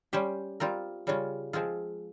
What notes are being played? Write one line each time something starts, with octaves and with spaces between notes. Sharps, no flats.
G3 C#4 G4 C5
G3 C4 F4 A#4
C#3 G3 C#4 F4
F3 G#3 C4 F4 G#4